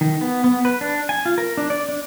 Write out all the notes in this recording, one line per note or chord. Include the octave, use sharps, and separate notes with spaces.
D#3
B3
B3
B4
D4
G#5
F4
A#4
D4
D5
D4